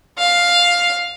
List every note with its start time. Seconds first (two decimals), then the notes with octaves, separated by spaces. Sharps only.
0.19 F5